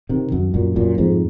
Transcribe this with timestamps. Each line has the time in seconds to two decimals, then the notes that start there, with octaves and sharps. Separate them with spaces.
0.09 C3 D#3
0.32 F#2
0.54 F#2 A#2
0.76 F#2 A#2
0.98 F2 G#2